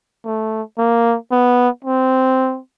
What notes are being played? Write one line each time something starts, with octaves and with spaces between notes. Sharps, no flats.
A3
A#3
B3
C4